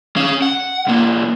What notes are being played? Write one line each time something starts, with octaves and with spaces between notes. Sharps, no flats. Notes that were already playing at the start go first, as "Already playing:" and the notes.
C#4 F5
F#5
B1 A#3